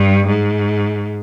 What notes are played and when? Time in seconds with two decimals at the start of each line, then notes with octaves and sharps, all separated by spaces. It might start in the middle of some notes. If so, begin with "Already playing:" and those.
Already playing: G2
0.27 G#2